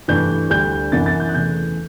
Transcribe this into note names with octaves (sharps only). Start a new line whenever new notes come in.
G2 E3 A3 D4 G6
D2 D3 G3 G6
F#2 E3 B3 D4 A6
A6
G6
F#6
E2 C#3 E3 A3 G6